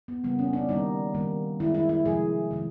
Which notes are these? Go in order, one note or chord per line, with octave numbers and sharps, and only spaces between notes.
B3
C#3 E3 G3 A#3 B3
C#4
D4
D#3 G3 A#3 D#4
D#3 G3 A#3
D#3 G#3 E4
E4
E4
C3 F3 G#3 G#4
C3 D#3 G#3